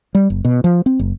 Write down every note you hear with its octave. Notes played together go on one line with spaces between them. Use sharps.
G3
F#1
B2
F3
C4
F#1